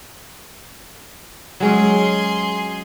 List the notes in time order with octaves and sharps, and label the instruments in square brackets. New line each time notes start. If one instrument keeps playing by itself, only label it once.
[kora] F#3 G#3 C#4 [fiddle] G#4 C6